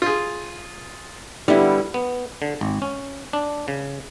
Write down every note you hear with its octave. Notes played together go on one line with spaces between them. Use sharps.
F4 G#4
D3 G3 B3 E4
B3
D3
G#1
C#4
D4
C#3